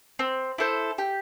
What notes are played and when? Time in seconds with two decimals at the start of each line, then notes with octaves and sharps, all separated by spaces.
0.19 C4
0.58 E4 A4 C5
0.98 G4